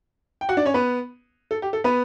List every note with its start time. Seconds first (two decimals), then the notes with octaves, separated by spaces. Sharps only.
0.41 G5
0.49 F#4 F#5
0.57 D4 D5
0.65 C#4 C#5
0.74 B3 B4
1.51 A4
1.62 G4
1.73 A4
1.84 B3 B4